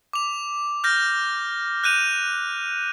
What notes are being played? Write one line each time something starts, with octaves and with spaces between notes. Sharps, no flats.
D6 F7
F6 G6 A#6
F#6 G6 D#7 F7